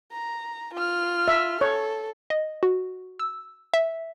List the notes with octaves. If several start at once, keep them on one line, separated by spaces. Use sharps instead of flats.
A#5
F4 F6
E5
A4 C#5
D#5
F#4
E6
E5